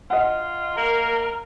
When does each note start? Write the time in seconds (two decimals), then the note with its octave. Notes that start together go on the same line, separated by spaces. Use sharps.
0.10 F4 D#5 F#5
0.77 A#3 A#4